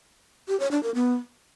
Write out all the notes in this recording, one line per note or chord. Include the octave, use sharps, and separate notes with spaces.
G4
C#5
D4
A#4
B3